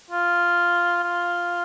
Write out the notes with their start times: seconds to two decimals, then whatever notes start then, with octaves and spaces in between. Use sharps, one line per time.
0.11 F4
1.04 F4